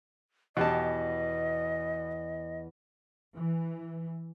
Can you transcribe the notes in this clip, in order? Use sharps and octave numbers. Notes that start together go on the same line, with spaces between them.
E2 B2 G4 D#5 A5
E3